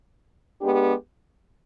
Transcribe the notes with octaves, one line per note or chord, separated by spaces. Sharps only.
G#3 B3 D4 G4